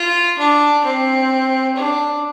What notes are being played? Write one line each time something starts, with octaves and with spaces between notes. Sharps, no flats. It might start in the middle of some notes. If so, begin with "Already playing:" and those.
Already playing: F4
D4
C4
D4